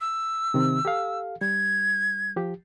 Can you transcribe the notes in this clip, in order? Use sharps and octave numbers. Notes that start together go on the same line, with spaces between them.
E6
C3 D#3 C4
G4 A4 F5
G3 G#6
F3 G4